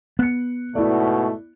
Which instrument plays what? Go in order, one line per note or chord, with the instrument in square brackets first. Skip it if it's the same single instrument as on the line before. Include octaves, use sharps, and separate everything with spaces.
[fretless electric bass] B3 [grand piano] F#6 C#7
[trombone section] G#2 B2 [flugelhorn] A3 [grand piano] E4 D5